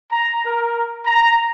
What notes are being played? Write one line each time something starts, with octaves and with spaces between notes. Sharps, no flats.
A#5
A#4
A#5